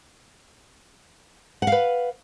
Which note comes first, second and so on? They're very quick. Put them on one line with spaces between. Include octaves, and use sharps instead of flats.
F#5 F5 B4